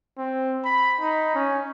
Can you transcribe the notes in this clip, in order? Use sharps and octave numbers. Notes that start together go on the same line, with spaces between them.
C4
B5
D#4
C#4